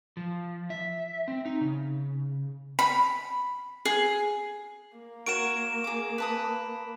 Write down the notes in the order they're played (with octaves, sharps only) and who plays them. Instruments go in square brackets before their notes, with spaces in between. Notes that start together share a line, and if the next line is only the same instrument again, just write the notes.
[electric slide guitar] F3
E5
C4
D#4
C#3
[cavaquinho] B5
G#4
[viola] A#3
[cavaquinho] F#4 A#4 C#5 [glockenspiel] D7 E7
[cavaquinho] G#4 D6
B4 A5 D#6